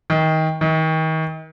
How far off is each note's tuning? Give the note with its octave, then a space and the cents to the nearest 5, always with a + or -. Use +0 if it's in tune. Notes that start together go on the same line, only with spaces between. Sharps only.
D#3 +25
D#3 +35